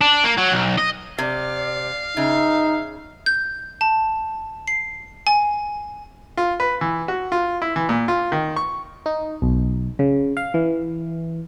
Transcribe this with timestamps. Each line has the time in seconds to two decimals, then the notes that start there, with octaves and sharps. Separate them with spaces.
0.01 D4
0.24 A#3
0.38 F#3
0.52 B1
0.78 D#5
1.18 C3 D5 F5
2.17 C#3 D#4 E5
3.26 G6
3.81 A5
4.68 C7
5.27 G#5
6.37 F4
6.60 B4
6.81 E3
7.08 F#4
7.32 F4
7.62 E4
7.76 E3
7.89 A#2
8.08 F4
8.32 D#3
8.56 C#6
9.06 D#4
9.42 B1
9.99 C#3
10.37 F5
10.54 E3